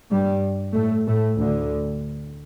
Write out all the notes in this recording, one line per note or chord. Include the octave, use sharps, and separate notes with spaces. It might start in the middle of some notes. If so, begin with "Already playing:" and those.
G2 G3
A2 A3
A2 A3
D2 D3